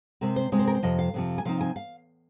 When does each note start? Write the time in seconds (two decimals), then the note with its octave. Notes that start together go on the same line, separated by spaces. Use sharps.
0.21 C3 G#3 C4 A#4
0.36 C5
0.52 C3 G#3 C4 D#5
0.59 C5
0.67 A#4
0.75 C5
0.83 F2 C3 F3 D#5
0.99 F5
1.14 F2 C3 F3
1.38 G#5
1.45 C3 F3 C4 D#4 F5
1.61 G#5
1.76 F5